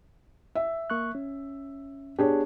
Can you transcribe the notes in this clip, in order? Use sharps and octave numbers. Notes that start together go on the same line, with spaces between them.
E5
A#3 C#6 F#6
C#4
B3 D4 G4 G#4 C#5